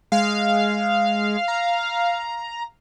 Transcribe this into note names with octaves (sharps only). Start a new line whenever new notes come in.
G#3 F5
A#5